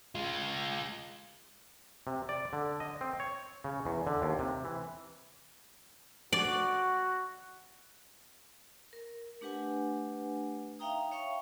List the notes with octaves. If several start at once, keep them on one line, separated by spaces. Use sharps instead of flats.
G#3 F4
C3
D5
D3
D#5
C4
C#5
C#3
E2
D3
D#2
C3
E3
F#4 D5
A#4
A3 D4 G4 B4 F#5 G#5
D#4 E5 F5 G5 A#5 D#6
C#5 E5 F5 G5 C#6